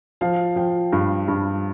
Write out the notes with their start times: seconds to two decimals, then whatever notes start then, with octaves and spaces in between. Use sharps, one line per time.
0.21 F3 F5
0.56 F3 G5
0.93 G2
1.28 G2